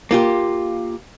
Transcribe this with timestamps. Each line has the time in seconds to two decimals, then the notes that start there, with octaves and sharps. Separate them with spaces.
0.11 A#3 F4 G4